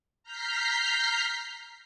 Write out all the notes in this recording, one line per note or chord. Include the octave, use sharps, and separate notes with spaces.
A#5 F6 G6 B6 C7